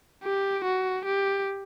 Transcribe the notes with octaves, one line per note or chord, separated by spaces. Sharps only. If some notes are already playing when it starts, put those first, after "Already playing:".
G4
F#4
G4